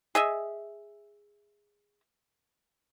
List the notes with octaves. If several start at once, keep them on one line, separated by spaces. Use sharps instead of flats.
G#4 D#5 E5